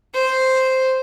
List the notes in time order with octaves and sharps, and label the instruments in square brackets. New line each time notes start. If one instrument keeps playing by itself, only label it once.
[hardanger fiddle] C5